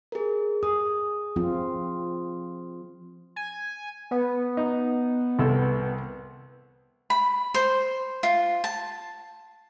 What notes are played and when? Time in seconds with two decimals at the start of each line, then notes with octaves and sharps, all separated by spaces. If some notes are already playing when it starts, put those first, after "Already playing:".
0.12 G#4 A#4
0.63 G#4 D#6
1.36 F3 C4 F4
3.36 G#5
4.11 B3
4.57 D#4
5.39 C2 A4
7.10 B5
7.54 C5
8.23 F4
8.64 A5